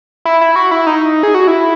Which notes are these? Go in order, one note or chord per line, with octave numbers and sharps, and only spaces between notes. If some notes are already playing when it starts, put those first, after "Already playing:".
E4
E4
F#4
E4
D#4
G#4
F#4
E4